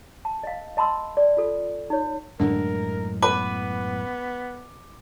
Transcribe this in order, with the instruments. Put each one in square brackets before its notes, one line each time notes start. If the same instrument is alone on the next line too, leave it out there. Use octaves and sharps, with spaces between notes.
[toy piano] A5
D#5 F5
D#5 A5 B5 C6 E6
D5
F4 A4
D#4 C#5
[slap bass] F#2 A2 G#3 [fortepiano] D3 [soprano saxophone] A#4
[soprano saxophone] B3 [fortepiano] B4 [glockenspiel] D6